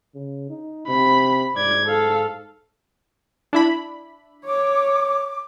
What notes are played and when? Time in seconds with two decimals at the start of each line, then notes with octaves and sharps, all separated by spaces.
0.15 C#3
0.50 D#4
0.88 C3 B5
1.56 G#2 D5 G#6
1.86 A4 F5
3.53 D4 E4 B5
4.45 C#5 D6